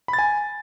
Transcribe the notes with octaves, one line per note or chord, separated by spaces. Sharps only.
B5
A6
G#5